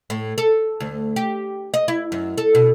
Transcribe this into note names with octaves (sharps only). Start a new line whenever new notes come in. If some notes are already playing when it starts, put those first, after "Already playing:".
A2
A4
D2
G4
D#5
E4
F#2
A4
B2